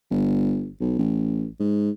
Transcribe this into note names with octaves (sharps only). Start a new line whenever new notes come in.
G1
B1
A1
G#2